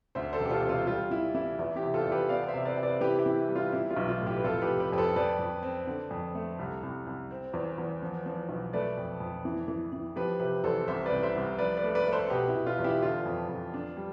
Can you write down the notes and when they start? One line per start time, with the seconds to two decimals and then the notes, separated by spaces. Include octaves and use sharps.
0.15 D2 C5 E5
0.33 A4 C5
0.40 E1
0.45 G4
0.51 F4 A4
0.63 C3
0.69 F4
0.87 G3 F4
1.11 E3 E4
1.34 E3 E4
1.59 E2 E4
1.76 E4 G4
1.83 C3
1.94 F4 A4
2.07 E2
2.12 G4 B4
2.29 B3 D5 F5
2.47 C5 E5
2.53 C3
2.65 B4 D5
2.77 C3
2.83 B4 D5
3.01 E3 G4 B4
3.19 E4 G4
3.26 E3
3.49 G3
3.56 F4
3.72 E3 E4
3.90 F4
3.97 B1
4.08 F4
4.20 A2
4.26 E4 G4
4.36 B4
4.44 F1 F4 A4
4.62 G4 B4
4.69 F1
4.80 G4 B4
4.92 F2 B4
4.98 A4 C5
5.16 F2 B4 D5
5.39 F2
5.63 C4
5.87 D3
6.11 F2
6.35 A3
6.59 C2
6.83 C2
7.07 C2
7.31 C4
7.53 E2
7.78 E2
8.02 F3
8.26 F3
8.49 B1
8.73 A3 B4 D5
8.98 F2
9.20 F2
9.45 E3
9.68 E3
9.93 E3
10.16 F3 G4 B4
10.40 C3 G4 B4
10.64 E2 A4 C5
10.87 C2 C5 E5
11.06 B4 D5
11.11 C2
11.23 C5 E5
11.36 C2
11.58 F3 B4 D5
11.77 B4 D5
11.83 A3
11.95 B4 D5
12.07 A3 B4
12.12 A4 C5
12.30 B2 G4 B4
12.48 E4
12.55 B2
12.67 F4
12.79 E2
12.84 E4 G4
13.02 D3 F4
13.26 F2
13.49 F2
13.74 D4
13.97 G3